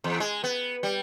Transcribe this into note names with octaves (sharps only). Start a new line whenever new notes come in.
E2
G#3
B3
G3